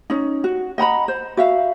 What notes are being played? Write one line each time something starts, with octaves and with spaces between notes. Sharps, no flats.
C#4 D#4
F#4
D#5 F#5 A#5 B5
C5
F#4 E5 F5